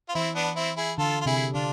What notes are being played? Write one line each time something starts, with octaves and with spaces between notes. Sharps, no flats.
F4
E3 C4 E4
B3 D4
C4 E4
E4 G#4
D3 F4 A4
F4
C3 E4 G#4
D3 D4 F4